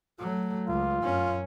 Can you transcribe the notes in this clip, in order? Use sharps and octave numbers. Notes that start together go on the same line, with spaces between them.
F#3 A3
C#2 F4
F#2 C#4